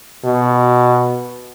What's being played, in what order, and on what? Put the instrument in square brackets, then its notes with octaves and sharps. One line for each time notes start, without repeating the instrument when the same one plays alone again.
[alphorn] B2